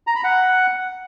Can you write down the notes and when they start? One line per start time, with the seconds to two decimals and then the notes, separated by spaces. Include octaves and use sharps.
0.07 A#5
0.15 B5
0.24 F#5